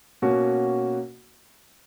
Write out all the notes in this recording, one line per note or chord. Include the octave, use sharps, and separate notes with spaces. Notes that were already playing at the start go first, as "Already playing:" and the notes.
B2 A#3 C#4 F#4